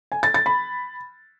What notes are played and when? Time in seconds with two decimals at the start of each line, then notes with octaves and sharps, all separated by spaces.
0.12 G#5
0.23 A6
0.34 A6
0.46 B5